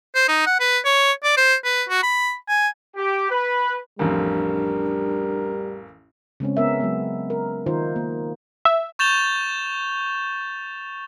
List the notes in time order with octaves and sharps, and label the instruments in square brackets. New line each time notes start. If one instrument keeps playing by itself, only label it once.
[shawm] C5
D#4
F#5
B4
C#5
D5
C5
B4
F#4
B5
G#5
[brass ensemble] G4
B4
[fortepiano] A1 F2 [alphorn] G3 [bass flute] D4 [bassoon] A#4
[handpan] C#3 G#3 C4 C#4
B3 A#4 E5
F#3 G#3 B3
A#4
D#3 D#4 F4 A#4 C5
A#3
[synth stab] E5
[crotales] C#6 G6 A6 E7 F7 G7